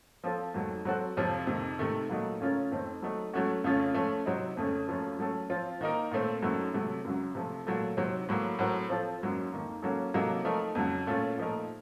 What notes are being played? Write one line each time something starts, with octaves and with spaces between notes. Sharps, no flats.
F3 C4 F4 A4
F2 D#3 F#3 A3
F#3 C4 F#4 A4
F2 C3 F3 C4 F4
F2 C3 D#3
C3 D#3 A3
A#2 F#3 A3 D#4
C#3 A3 C#4 F4 A#4
F2 D#3 A3 C4
F#3 A3 D#4
F#3 A3 C#4 F#4
F2 C#3 A3 C#4 F4
F3 A3 C#4
C3 F#3 C4 D#4
F2 C#3 A3 C#4 A4
F#2 F3 A3 C#4 F4
F#3 A3 C#4 A4
F3 C4 F4
D#3 A#3 D#4 A#4
A#2 A3 C4
F#2 D#3 F#3 A3
C3 F#3 A3
F#2 C#3 F#3
C3 F3 A3
A#2 F#3 A3
C3 D#3 F#3 C4
A2 F#3 A#3
A2 F#3 C4 F#4 A#4
F3 C4 F4 A4
F#2 D#3 F#3 A#3
F2 D#3 A#3
F#3 A#3 C#4 A4
C3 F#3 A#3 D#4 A4
F3 A3 D#4 A#4
F2 C#3 F#3
A#2 A3 C#4 F4
A#2 F3 A3 D#4 A#4